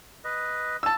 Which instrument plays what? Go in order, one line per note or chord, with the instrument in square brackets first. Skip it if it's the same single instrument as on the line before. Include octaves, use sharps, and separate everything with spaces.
[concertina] B4 D#5
[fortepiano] A5 E6